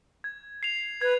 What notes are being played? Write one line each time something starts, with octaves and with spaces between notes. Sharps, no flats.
G#6
C7 F7
B4 G#6